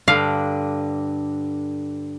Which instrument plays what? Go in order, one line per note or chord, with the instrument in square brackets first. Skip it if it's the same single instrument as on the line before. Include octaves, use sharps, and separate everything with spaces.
[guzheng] G2 D3 [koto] F5